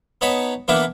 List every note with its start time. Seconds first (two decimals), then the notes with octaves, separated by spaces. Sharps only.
0.21 B3 D#4 C#5 A5 B5
0.68 E3 A#3 B3 D4 E4 B4